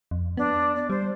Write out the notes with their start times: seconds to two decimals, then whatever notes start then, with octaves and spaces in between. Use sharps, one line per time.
0.11 F2
0.37 B3 D4
0.75 D5
0.90 G3 C5